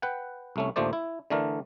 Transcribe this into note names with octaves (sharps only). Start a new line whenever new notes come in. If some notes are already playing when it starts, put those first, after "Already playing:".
B4 F#5 G5
C2 A3 C#4
A#1 D#2 F3 A3 C5 D5
E4
D3 E3 A3 D4 A#4